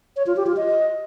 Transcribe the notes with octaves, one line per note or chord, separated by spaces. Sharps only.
C#5
F4
G4
F4
D#5